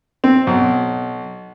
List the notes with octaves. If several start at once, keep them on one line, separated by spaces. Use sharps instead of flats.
C4
B1